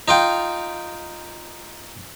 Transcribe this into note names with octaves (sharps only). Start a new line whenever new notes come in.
D#4 F4 G5